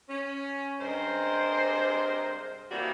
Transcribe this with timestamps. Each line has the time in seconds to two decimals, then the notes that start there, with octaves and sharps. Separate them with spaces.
0.09 C#4
0.80 G2 C3 G#3 A#4 C5
2.71 C3 D#3 E3 G3 A#3 F#4